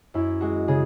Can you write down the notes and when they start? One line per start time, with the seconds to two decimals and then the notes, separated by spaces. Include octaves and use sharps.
0.14 F#2 E4
0.41 G#3 F#4
0.68 C#3 G#4